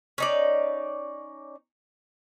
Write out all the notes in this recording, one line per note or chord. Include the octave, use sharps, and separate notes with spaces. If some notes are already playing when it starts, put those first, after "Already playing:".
C#4 D#4 D5